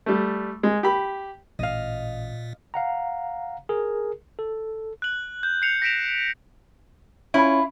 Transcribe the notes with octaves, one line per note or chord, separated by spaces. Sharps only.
G3 A3
G#3
G4 B5
A1 A#2 D#5 F5
F5 F#5 A#5
G#4 A#4
A4
F#6 F#7
G6
G6 C7 C#7 F7
A#6 B6 D7 E7 F7
C#4 E4 F4